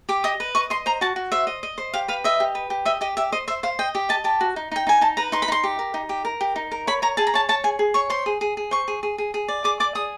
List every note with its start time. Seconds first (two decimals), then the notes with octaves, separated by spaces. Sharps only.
0.09 G4 D6
0.24 D#5 D#6
0.40 B4
0.55 D#5 C#6
0.70 D#5 C6
0.86 C5 A#5
1.01 F#4 A5
1.16 F#4
1.32 C5 E5
1.47 D#5
1.63 D#5
1.78 C5
1.94 G4 F5
2.08 B4 F5
2.24 D#5 E5
2.40 G4
2.55 B4
2.70 G4
2.85 D#5 E5
3.01 G4 D#5
3.17 G4 E5
3.32 C5 D#5
3.48 C5 E5
3.63 C5 F5
3.79 D#5 G5
3.95 G4
4.09 D#5 A5
4.24 G4 A5
4.41 F#4
4.56 D#4
4.72 D#4 G5
4.87 D#4 G#5
5.01 D#4 A5
5.17 B4 A#5
5.32 D#4 C6
5.42 B5
5.48 D#4 C6
5.64 G4
5.79 A#4
5.94 D#4
6.09 G4
6.25 A#4
6.41 G4
6.56 D#4
6.72 A#4
6.87 C#5 B5
7.02 C#5 A#5
7.17 G#4 A5
7.27 A#5
7.34 C#5 A5
7.49 C#5 A5
7.64 G#4 G#5
7.79 G#4
7.94 C#5 C#6
8.10 C5 C6
8.26 G#4
8.41 G#4
8.57 G#4
8.71 C5 C#6
8.88 G#4
9.03 G#4
9.18 G#4
9.34 G#4
9.48 D5
9.64 G#4 D6
9.80 D5 D6
9.95 G#4 D#6